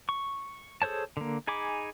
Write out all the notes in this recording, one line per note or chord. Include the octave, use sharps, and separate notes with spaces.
C#6
G#4 A4 C5 C#5 A5
D3 A#3
D#4 G#4 G#5 B5 D6